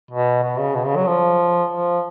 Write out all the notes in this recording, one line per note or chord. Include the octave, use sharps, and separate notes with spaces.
B2
B2
C#3
B2
C#3
F#3
F3
F3